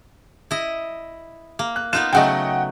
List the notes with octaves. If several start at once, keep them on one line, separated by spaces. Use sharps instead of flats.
E4 D#5
A#3
F#6
B3 D#4 F4 F#6 E7
C#3 F#3 A3 D#5 F#5 G5